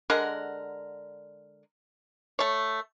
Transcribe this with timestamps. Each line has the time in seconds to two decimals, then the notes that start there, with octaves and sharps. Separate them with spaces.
0.10 D3 G#3 A#4 F#5
2.39 A3 C#5